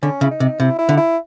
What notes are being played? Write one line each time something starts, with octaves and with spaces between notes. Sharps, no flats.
D3 C#4
C#3 E4
D#4
C3
C3 E4
E4
D3
E4